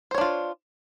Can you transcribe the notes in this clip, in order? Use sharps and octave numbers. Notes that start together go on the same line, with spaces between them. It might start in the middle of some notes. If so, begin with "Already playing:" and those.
D4 F4 C5 C#5